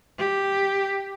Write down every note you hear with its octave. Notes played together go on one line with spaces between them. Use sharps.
G4